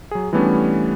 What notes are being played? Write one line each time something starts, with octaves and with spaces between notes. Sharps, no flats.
F#3 G#4
E3 G3 A3 B3 C#4 D4